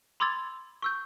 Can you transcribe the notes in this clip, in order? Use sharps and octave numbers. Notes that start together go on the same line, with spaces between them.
B5 C6 D6 E6 G#6 A6
C#6 E6 G6